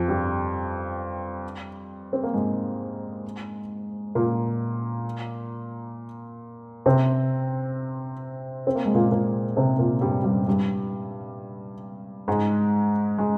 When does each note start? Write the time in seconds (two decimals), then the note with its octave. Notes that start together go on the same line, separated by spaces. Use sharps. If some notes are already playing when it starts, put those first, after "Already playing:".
Already playing: F2 F3
0.08 G2 G3
2.13 C4
2.23 A#3
2.34 G#2 G#3
4.15 A#2 A#3
6.86 C3 C4
8.67 C4
8.75 A#3
8.85 G#3
8.94 A#2 A#3
9.12 A#2 A#3
9.57 C3 C4
9.79 A#2 A#3
10.01 G2 G3
10.24 G2 G3
10.47 G2 G3
12.28 G#2 G#3
13.18 G#3